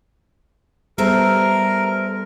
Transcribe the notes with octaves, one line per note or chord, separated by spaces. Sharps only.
G3 B3 A4 A#4 C5 E5